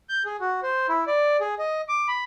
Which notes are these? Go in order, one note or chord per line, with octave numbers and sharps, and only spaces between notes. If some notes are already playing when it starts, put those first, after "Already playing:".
G6
G#4
F#4
C5
E4
D5
G#4
D#5
D6
B5